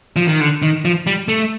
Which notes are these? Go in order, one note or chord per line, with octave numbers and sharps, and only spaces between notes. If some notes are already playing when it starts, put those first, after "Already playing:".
F3
D#3
D3
D#3
F3
G3
A3